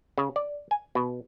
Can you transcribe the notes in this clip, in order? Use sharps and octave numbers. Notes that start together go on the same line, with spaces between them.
C#3
D5
G#5
B2